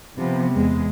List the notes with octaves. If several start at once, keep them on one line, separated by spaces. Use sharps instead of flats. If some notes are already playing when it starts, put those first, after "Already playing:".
C3 F3 B3
E2 G#3